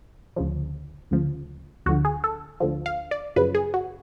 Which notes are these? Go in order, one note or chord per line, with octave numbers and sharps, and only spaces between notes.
D2 C#3 F3
D2 C#3 F3
D2 D3 F3 F#4
G#4
A4
D2 D3 F3
F5
D5
F#2 C#3 F3 B4
G#4
F#4